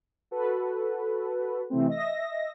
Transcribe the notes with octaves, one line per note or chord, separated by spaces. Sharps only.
F#4 A4 B4
C3 E3 A3 C4
D#5 E5 A#6